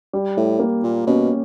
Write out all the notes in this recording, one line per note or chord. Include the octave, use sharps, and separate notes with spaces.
G3
A2
A#3
A#2
B2 C#4